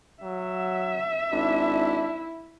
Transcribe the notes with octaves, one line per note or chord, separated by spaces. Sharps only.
F#3 E5
G#1 D4 E4